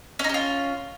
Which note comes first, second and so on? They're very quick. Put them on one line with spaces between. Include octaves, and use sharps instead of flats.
C#4 D#4 G4 F4